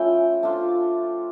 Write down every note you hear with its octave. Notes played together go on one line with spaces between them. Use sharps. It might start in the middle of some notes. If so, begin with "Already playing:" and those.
Already playing: F3 A3 C#4 E4 G5
A3 D4 F4